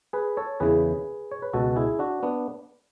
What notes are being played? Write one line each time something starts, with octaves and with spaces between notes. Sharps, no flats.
G#4 B4
A4 C#5
E2 C#3 E3 G#4 B4
C#5
B4
C#2 B2 F#4 A4
E4 G#4
D4 F#4
B3 D4